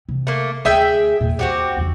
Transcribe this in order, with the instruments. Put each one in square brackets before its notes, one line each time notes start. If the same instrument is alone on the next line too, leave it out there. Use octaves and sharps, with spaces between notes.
[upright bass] C3
[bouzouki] A3 A#3
[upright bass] D2 [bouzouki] G#4 E5 G5
[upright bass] E2 A#2
[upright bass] D#2 [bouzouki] C4 F#4 G4
[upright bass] E2 D3